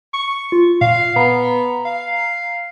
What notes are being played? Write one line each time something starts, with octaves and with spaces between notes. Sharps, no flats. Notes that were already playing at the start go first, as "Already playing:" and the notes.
C#6
F4
A#2 F5
B3 A#5
F5